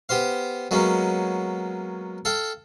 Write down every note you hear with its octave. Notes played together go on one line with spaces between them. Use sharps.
B3 G4 C5 F5
F#3 G#3 A#3 B3 C#4
A4 F5 G5